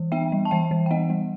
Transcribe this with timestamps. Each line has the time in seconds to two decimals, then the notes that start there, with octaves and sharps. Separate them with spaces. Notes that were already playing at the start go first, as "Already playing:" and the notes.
Already playing: E3
0.12 B3 E5 G5
0.32 G3
0.45 A5
0.51 E3 E5 G5
0.71 E3
0.86 G5
0.91 B3 D#5 F#5
1.10 G3